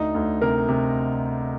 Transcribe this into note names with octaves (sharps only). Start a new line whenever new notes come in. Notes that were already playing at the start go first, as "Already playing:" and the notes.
Already playing: D2 D#4
D2
C3 A#4
C3